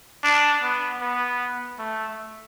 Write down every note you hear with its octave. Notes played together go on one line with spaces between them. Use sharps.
D4
B3
B3
A3